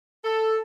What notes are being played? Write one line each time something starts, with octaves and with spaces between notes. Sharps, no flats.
A4